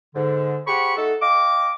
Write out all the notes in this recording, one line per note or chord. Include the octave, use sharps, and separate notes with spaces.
G#2 D3
G4 G#4 C5 F#5 B5 C#6
A3 D#4 F#4 A4
D#5 F5 G5 D6